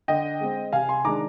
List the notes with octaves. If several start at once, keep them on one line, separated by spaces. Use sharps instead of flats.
D3 D#5 G5
G#3 C4
C3 F5 G#5
G#5 C6
D#3 G#3 D4 A#5 D6